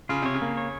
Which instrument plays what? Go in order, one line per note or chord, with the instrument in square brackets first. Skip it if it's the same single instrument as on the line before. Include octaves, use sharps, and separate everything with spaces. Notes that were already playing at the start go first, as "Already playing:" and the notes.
[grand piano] C#3 [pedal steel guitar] F4
[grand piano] C3 [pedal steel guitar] C#5
[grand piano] C#3
[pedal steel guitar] A#3
C#5